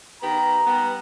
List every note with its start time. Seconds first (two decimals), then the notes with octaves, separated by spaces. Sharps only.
0.21 D#3 B3 G4 A#5
0.65 G3 B3